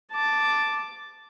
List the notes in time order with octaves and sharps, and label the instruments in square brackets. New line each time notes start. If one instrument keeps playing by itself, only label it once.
[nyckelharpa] A5 D6